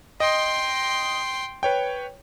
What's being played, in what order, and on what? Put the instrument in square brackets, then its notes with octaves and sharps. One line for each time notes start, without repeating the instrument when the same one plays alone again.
[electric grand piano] D#5 [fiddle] G5 C6
[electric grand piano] B4 C#5 G5